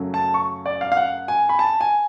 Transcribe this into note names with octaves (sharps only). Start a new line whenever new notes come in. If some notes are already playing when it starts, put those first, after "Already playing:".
Already playing: F#2 C#3 F#3 A3
A5
C#6
D5
F5
F5
F#5
G#5
B5
A5
G#5